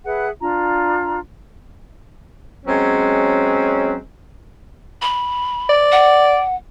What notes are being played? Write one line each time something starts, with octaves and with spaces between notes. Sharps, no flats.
G#4 B4 E5 F#5
D4 F4 A#5
F#3 G#3 C4 C#4
B5
D5
F#5